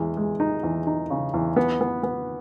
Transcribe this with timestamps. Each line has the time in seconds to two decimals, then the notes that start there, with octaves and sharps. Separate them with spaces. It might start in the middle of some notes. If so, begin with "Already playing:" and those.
Already playing: E2 G#3
0.17 G#3
0.40 D#4
0.63 E2
0.87 D#4
1.10 C#3
1.34 E2
1.56 B3
1.81 B3
2.03 B3